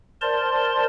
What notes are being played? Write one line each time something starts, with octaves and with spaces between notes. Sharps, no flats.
A#4 C5 D5 A5 C6